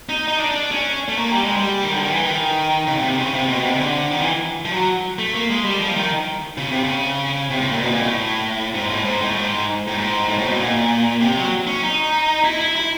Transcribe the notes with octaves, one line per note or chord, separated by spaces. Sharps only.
D#4
D#4
D4
D4
C#4
A3
A#3
G3
G#3
G3
D#3
D3
D#3
E3
D#3
C#3
C#3
C3
C#3
C3
B2
C3
C#3
D3
D#3
E3
F3
F#3
A3
A#3
G#3
G3
F3
D#3
C#3
C3
C#3
C3
A2
A#2
B2
A#2
A2
G#2
A2
G#2
A2
G#2
A2
G#2
A2
A2
B2
A#2
C3
F#3
C#4
D#4
E4
E4
E4